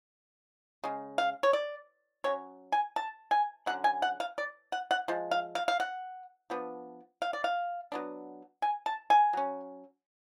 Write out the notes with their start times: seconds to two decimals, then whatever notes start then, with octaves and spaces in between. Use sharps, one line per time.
0.84 C#3 G#3
1.18 F5
1.43 C#5
1.53 D5
2.24 F#3 C#4 C#5
2.72 G#5
2.96 A5
3.31 G#5
3.66 D3 F#3 C#4 F#5
3.84 G#5
4.02 F#5
4.20 F5
4.38 D5
4.72 F#5
4.91 F#5
5.08 F3 G#3
5.31 F5
5.55 F5
5.68 F5
5.80 F#5
6.50 F3 B3 D4
7.22 F5
7.33 D5
7.44 F5
7.92 F#3 B3 D4
8.62 G#5
8.86 A5
9.10 G#5
9.33 F#3 C#4